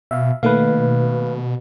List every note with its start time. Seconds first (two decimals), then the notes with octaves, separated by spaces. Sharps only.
0.11 B2 E5 F5
0.43 B2 D#3 A3 A#3 B4 F5